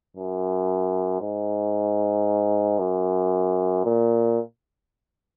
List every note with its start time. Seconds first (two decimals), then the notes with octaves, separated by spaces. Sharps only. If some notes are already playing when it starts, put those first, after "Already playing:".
0.16 F#2
1.21 G#2
2.79 F#2
3.85 A#2